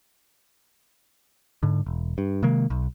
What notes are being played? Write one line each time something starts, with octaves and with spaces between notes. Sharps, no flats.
G#2 D3
E1
G2
C3 D#3 G#3 A#3
B1